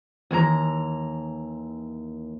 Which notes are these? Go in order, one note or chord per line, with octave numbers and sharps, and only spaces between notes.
D#2 E3 C#5 A#5